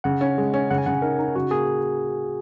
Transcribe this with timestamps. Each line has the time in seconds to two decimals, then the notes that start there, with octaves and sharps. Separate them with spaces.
0.04 C#3 F#5
0.21 C#4
0.38 G#3
0.54 C#4
0.71 C#3 F#5
0.78 G#5
0.86 C#3 F#5
1.02 D#4 A#4
1.19 D#4
1.36 C#3 F#4
1.51 A#3 G#4